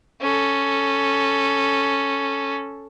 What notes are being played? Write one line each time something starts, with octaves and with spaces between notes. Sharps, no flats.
C#4 A4